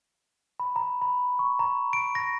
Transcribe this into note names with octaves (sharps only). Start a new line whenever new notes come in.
B5
A#5
B5
C#6
A#5
D7
A#6